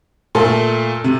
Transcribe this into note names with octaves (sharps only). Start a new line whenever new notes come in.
A#2 A3 A4
C3